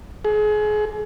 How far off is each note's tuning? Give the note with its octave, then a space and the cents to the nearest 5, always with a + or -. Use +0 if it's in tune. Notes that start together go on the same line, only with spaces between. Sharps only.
G#4 +30